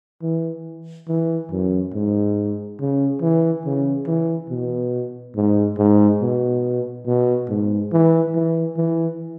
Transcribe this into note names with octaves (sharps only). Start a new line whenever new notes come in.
E3
E3
F#2
G#2
C#3
E3
C#3
E3
B2
G#2
G#2
B2
B2
G#2
E3
E3
E3